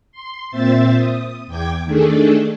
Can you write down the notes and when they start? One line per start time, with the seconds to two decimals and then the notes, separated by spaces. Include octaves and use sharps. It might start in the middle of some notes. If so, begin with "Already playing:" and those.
0.12 C6
0.51 A#2 C4 C5 E5 A6
0.96 D#6
1.47 E2 G5 D6 G#6
1.85 D#3 A3 D4 G#4 A4